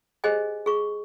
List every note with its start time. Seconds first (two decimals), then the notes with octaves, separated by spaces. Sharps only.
0.24 G4 G#4 C5 D#5 G#5
0.66 G#4 C#6